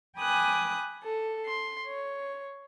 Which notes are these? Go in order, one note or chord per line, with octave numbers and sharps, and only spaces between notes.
G5 G#5 B5 D6 D#6 F#6
A4
C6
C#5